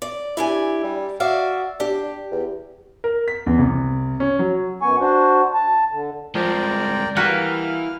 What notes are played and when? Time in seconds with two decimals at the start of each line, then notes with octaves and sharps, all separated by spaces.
0.02 D5
0.37 D4 E4 G4 G#5
0.84 G3
1.20 F#4 D5 E5 F5
1.80 D4 G4
2.31 E2
3.04 A#4
3.28 B6
3.47 E2
3.59 C2
4.20 C#4
4.39 F#3
4.82 F#2 B3 G#5 C#6
5.00 D4 F#4 C5
5.54 A5
5.92 D3
6.35 C2 F3 G#3 A#4 D5 G5
7.16 E3 G3 A#3 F#4 B4 F5